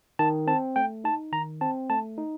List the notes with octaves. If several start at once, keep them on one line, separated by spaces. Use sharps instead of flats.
D#3 A5
C4 A5
A3 G5
D#4 A5
D#3 A#5
C4 A5
A3 A5
D#4